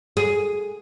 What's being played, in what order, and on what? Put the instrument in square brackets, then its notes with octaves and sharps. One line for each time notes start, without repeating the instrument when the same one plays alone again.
[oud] G#4